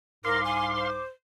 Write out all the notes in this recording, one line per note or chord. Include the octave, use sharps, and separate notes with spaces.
C2 G#2 A#4 F5 C6 D6
G#5
C5